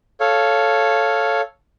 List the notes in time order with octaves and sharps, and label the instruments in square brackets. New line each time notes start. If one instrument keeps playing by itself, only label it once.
[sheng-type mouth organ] A4 C#5 F5